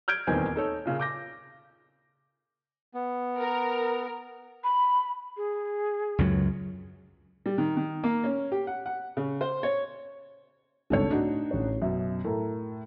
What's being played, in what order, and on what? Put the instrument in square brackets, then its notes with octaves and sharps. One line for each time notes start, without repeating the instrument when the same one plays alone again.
[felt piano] F6 G6 G#6 D7
D#1 E2 D#3 C4 G#5
D#4 A4 C#5
A#2 C#3
D6 G6 A#6
[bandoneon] B3
[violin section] A#4
[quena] B5
G#4
[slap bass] C#2 F#2 F#3
[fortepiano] G3
D#3
D#3
A#3
C#4
G4
F#5
F#5
C#3
C5
C#5
[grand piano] G#1 C#2 G2 [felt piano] D4 A4 C#5
[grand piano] A2 [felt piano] D4 D#4 F#4
[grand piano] A1 C#5
[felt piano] F#2 B2 [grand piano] E5
[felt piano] A2 [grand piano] A4 A#4 A#5